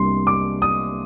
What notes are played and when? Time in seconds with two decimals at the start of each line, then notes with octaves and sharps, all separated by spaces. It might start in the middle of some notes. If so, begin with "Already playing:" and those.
Already playing: C2 C3 G3 A#3 D4 C6
0.27 D6
0.62 D#6